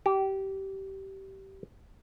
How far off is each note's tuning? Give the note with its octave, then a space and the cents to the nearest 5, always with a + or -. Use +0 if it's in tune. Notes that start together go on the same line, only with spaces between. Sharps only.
G4 -20